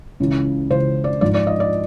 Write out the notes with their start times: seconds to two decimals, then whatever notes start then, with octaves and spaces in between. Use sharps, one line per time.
0.20 C#2 C#3 E3
0.70 C#2 C#3 E3 C5
1.04 D5
1.21 G#2 F3 D5
1.34 D5
1.47 D#5
1.60 D5